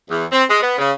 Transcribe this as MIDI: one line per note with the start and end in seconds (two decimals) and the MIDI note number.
0.10 0.25 40
0.31 0.43 60
0.50 0.59 56
0.62 0.73 59
0.78 0.92 49